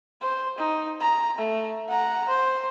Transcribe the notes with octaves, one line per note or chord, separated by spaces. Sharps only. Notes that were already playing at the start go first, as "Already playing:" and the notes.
C5
D#4
A#5
A3
F#5 A#5
C5